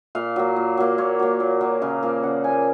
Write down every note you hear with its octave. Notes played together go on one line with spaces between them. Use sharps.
A#2 F5
F#3 A#3
A#2
F#3 A#3
A#2 C#5
F#3 A#3
A#2
F#3 A#3
C#3 F5
F3 A#3
C#3 F#5
F3 A#3 G#5